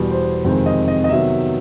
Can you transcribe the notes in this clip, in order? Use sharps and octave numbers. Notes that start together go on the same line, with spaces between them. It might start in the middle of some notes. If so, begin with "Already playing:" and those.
Already playing: E2 B2 G3
C5
F2 C3 D#3 G#3 C4
D#5
D#5
D#5
C3 D#3 F#3 B3 E5